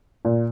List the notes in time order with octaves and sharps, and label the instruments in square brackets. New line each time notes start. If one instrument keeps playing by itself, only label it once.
[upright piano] A#2